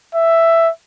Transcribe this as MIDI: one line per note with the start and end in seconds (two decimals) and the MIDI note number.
0.15 0.70 76